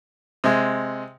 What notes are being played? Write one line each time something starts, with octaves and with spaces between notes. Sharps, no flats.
C3 G#3